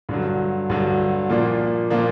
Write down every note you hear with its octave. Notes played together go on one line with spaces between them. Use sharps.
G2 D3 F#3
G2 D3 F#3
A#2 F3 A#3 D4
A#2 F3 A#3 D4